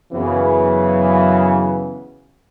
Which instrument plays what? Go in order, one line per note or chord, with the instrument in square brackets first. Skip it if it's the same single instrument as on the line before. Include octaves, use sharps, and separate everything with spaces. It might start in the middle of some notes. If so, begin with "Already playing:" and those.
[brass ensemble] F#2 C#3 E3 B3